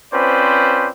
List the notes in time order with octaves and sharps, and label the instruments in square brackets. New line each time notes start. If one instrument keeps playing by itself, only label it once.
[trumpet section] C4 C#4 F4 B4 C5 D5